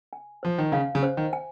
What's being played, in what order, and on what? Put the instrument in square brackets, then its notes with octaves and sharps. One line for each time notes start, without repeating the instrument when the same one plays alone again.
[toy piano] G#5
[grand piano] F3 [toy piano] C5
[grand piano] D#3
[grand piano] C#3 [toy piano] F5
[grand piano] C#3
[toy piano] C5
[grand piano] D#3
[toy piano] G#5